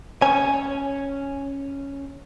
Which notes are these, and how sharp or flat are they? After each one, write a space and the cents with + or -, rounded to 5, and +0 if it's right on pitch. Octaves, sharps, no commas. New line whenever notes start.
C#4 +0 C#5 +0 G#5 +0